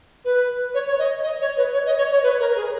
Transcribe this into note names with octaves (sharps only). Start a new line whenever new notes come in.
B4
C#5
C#5
D#5
D#5
C#5
B4
C#5
D#5
C#5
C#5
B4
A#4
G#4